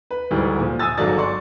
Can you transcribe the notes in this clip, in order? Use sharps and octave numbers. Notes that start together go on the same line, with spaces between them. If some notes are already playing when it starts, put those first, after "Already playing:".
B4
D2 G#2 E3 G3
A#2 F3
G#5 D#6 E6 A6
G1 G#2 F#3 A4 D5 A6
D5 C6 C#6